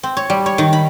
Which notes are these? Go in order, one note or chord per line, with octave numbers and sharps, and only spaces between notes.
C4
C#5
G3
C#5
D#3
B5